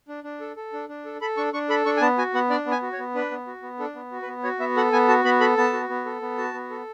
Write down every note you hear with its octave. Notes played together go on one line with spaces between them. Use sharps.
D4
D4
A4
A4
D4
D4
A4
A4 B5
D4 C#6
D4 C#6
A4 B5
D4 C#6
G#5
B3 A5
F#4 G#5
B3 F#5
D4 D5
B3
G#5
F#4
C#5
B3
D4 B4
B3
F#4
B3
D4 A4
B3
F#4
B4
B3
F#4 C#5
B3 E5
A4 F#5
B3 G#5
F#4 A5
B3 B5
A4 B5
B3 A5
F#4
B3
A4
B3
F#4 A5
B3
A4